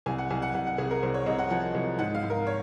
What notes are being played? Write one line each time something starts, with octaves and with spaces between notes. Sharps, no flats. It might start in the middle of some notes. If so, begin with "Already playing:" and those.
C2 G#5
F#5
C2 G#5
F#5
C2 F#5
F#5
C2 G#4
A#4
C2 C5
C#5
C2 D#5
F#5
F3 F#5
C2
G#2 F#5
F5
G#2
A#4
C#5